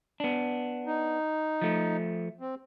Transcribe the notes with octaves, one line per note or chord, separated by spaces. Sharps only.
B3 D4
D#4
F3 A3
C4